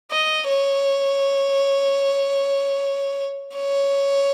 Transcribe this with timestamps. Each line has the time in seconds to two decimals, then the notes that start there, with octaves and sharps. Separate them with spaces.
0.11 D#5
0.49 C#5
3.56 C#5